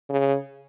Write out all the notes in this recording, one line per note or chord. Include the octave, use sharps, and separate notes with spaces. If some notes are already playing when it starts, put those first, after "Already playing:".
C#3